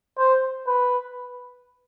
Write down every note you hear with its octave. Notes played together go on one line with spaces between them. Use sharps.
C5
B4